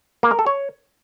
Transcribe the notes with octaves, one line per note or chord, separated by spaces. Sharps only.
A#3
A#4
A4
C#5